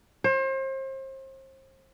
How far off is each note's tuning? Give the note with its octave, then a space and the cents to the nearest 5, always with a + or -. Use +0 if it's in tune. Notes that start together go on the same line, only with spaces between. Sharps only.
C5 +35